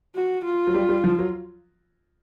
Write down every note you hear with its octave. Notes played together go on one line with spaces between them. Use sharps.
F#4
F4
F#3
G3
G3
F3
F#3